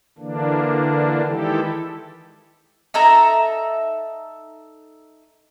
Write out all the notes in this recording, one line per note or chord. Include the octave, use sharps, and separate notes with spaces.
D3 E3 A#3 D4
D#3 E3 G#3 E4 G4 A4
D#4 A4 E5 A#5